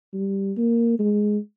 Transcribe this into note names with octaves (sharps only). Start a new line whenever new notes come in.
G3
A#3
G#3